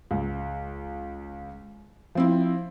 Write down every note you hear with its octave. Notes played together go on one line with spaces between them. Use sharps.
C#2
F3 C4 E4